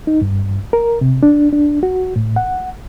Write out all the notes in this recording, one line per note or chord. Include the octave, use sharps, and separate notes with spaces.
D#4
G2
A#4
C3
D4
D4
F#4
A2
F#5